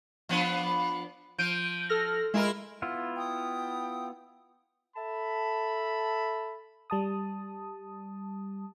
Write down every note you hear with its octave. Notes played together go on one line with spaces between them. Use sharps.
F3 B3 D4
F3 G6 D7 D#7
A4 F6 A#6
G#3 E4 F4 A#4
B3 E4 F4
G5 D#6
A4 E5 A5 B5
G3 A5 D#6